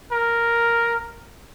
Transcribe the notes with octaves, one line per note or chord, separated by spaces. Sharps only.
A#4